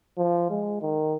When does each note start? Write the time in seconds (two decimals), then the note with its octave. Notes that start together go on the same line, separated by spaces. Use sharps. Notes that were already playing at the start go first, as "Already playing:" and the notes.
0.18 F3
0.50 G#3
0.82 D#3